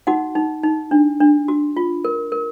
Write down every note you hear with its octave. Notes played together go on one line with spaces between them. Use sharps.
D#4 F#4 F#5
D#4
D#4
D4
D4
F#4
F4
A#4
A#4